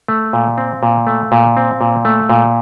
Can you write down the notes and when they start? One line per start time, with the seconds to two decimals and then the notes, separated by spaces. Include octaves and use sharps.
0.08 A3
0.33 A#2
0.58 C4
0.83 A#2
1.07 A3
1.32 A#2
1.57 C4
1.81 A#2
2.05 A3
2.29 A#2